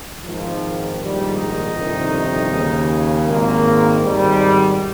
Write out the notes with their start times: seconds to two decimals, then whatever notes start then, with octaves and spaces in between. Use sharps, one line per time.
0.23 G#1 G#2 D#3 F3
0.99 A#1 G#2 D#3 G3
1.36 D#4
1.75 G1 F2 C3 D#3
2.51 D#2 C#3
3.27 G#1 G#2 D#3 A#3
4.02 G#1 G#2 D#3 G3